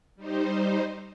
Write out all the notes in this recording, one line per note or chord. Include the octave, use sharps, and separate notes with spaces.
G3 D#4 C5